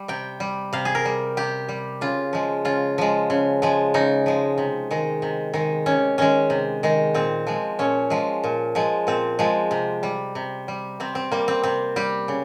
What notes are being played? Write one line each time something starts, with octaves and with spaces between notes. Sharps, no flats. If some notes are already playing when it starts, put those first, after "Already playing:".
Already playing: G3
C3 G5
G3
C3 F5
G#4
A#4
G3
C3 G4
G3
C#3 F4
F3 G#3
C#3 F4
F3 G#3
C#3
F3 G#3
C#3 D#4
F3 G#3
C3
D#3 G#3
C3
D#3 G#3
C3 C#4
D#3 G#3 C#4
C3
D#3 G#3
A#2 C4
F3 G#3
A#2 C#4
F3 G#3
A#2
F3 G#3
A#2 C4
F3 G#3
C3
G3
C3
G3
C3 C4
C4
G3 A#3
C4
C3 C4
G3 G4
C#3